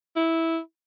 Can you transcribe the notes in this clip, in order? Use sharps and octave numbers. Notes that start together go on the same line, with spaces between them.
E4